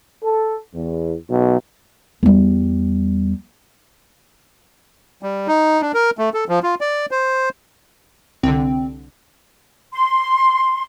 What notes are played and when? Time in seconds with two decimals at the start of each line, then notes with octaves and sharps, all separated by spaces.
0.24 A4
0.74 E2
1.29 B1
2.23 E2 G3
5.23 G3
5.48 D#4
5.81 D4
5.94 A#4
6.18 A3
6.34 A4
6.49 F3
6.63 F4
6.81 D5
7.11 C5
8.43 C2 D3 C4
9.92 C6